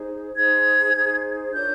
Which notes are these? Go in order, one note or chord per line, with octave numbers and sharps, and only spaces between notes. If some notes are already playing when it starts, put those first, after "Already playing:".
Already playing: D#4 G#4 C5
D#4 G#4 C5 G#6
D#4 G#4 C5
D4 F4 A#4 C#5 G6